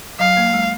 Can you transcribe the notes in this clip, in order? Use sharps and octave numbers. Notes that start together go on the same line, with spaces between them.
F#3 F5
A#3
G#3